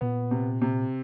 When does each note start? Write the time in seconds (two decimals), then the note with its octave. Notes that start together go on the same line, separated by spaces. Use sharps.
0.01 A#2 B3
0.31 C3
0.62 C3